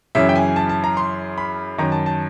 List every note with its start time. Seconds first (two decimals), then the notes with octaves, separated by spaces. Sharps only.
0.15 F#2 C#3 E3 E5
0.29 G5
0.36 G#5
0.56 A5
0.69 A5
0.84 A#5
0.97 C6
1.38 B5
1.78 F#2 D#3 A#5
1.92 A5
2.06 A5